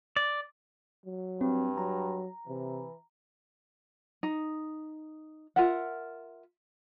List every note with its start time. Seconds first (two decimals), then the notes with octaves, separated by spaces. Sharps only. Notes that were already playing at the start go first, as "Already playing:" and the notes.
0.16 D5
1.06 F#3
1.41 G2 C4
1.78 F#3 A#5
2.47 C3 E3
4.23 D#4
5.56 F4 A#4 E5 F#5